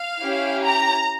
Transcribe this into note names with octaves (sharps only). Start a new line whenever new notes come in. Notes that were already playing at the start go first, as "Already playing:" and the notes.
Already playing: F5
C#4 E4 G4
A#5